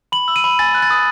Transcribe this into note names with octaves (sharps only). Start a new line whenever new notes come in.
B5 F#7
E6
D#7
B5
G#5 A6
F#6
A6
D#6